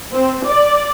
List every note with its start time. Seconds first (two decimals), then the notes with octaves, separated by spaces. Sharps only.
0.13 C4
0.47 D5